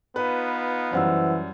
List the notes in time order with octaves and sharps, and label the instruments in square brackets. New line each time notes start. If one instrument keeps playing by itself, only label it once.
[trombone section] B3 D#4 F4 [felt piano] B4
[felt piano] F#2 G3 [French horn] E3 [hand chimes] C5 F#5 E6